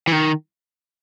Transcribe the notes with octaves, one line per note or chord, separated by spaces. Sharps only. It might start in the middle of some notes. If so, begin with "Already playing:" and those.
E3
D#3